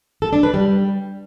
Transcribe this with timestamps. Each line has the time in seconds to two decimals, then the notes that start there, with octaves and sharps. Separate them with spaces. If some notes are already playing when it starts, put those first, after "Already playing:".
0.22 A4
0.33 D4
0.43 B4
0.54 G3